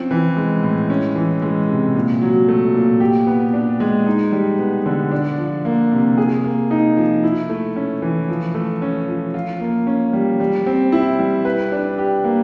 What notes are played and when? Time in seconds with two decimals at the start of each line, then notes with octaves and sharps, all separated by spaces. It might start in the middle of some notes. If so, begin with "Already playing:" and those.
Already playing: F3 C4 C#4
0.11 E3
0.37 G#3
0.63 A2
0.90 C#4
1.15 E3
1.42 G#3
1.69 C3
1.95 A#2
2.22 F#3
2.48 A3
2.75 A#2
3.00 G4
3.27 B3
3.53 D4
3.80 G#3
4.06 D#4
4.32 G3
4.59 B3
4.86 D3
5.11 D4
5.38 F3
5.65 A#3
5.92 C3
6.17 G#4
6.44 A#3
6.71 D#4
6.97 F3
7.23 E4
7.50 A3
7.76 C#4
8.02 E3
8.28 F3
8.54 A3
8.82 C#4
9.08 F3
9.34 F4
9.61 A#3
9.87 C#4
10.13 G3
10.40 G3
10.66 C4
10.92 E4
11.19 G3
11.45 B4
11.72 D4
11.98 G4
12.24 A#3